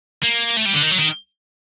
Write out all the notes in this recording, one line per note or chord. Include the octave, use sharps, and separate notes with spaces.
A#3
A3
G3
D3
D#3
F#3
D#3